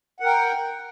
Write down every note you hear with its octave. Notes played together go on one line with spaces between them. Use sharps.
A#4 F#5 G5